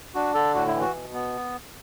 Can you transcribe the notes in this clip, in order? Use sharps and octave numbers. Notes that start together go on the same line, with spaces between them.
D4 F#4
D3 A4
A2 F#4
E4
E3
F#4
B2
B3